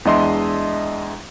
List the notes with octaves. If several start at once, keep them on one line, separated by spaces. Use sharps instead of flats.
E2 G#3 D4 D#5 E5 C6